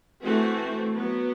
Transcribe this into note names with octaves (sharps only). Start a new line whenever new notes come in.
E3 A3 C4 F#4
F#3 B3